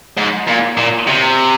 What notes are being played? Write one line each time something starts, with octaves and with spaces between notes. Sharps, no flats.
G#2
A#2
A#2
C3